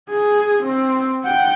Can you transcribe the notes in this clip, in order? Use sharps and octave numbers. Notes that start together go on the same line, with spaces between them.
G#4
C4
F#5 G5